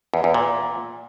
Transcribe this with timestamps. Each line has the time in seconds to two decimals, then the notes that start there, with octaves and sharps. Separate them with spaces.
0.14 E2
0.24 E2
0.34 A#2